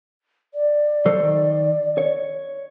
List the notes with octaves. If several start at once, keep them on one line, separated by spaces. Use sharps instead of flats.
D5
F#3 A4 C5
D#3
C#5